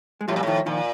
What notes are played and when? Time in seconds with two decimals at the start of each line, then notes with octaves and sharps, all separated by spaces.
0.21 G#3
0.28 A2 F3 G3
0.36 A#2
0.43 A2 D#3 F3
0.66 A#2 D#3 F3